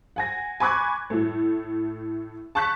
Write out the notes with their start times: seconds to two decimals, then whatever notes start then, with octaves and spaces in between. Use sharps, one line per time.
0.16 F#5 G#5 A#6
0.60 G#5 B5 C#6 D6 F#6 G#6
1.10 A2 A3
2.55 A5 C#6 F#6 G6 B6